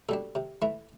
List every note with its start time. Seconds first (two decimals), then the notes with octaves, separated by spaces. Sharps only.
0.09 B2 G3 D4 A4
0.35 C3
0.62 E3 A3 E4